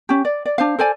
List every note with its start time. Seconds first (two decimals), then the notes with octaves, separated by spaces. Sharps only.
0.09 C#4 G4
0.25 D5
0.46 D5
0.58 D4 C5 F5
0.79 A4 C5 D5 G#5